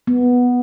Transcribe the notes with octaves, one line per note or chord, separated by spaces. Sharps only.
B3